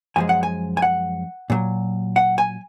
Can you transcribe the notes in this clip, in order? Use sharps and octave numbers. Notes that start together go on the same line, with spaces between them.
F#2 F3 G#3 G#5
F#5
G#5
G#5
F#5
A#2 F#3
F#5
G#5